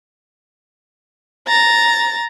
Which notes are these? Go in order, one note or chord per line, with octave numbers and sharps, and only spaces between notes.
A#5 A6